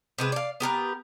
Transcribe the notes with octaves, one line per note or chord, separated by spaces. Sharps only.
C3 G#3 B4
D5 F5
B3 G4 A#4 B4